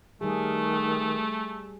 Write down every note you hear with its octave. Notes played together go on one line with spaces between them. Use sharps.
D#3 G3 A3 G#4